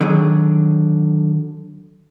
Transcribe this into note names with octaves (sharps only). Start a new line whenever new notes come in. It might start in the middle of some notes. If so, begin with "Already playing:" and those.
D3 D#3 F#3 G#4